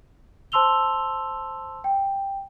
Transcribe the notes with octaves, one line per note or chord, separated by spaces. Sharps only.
C5 A5 C6 E6 F7 G7
G5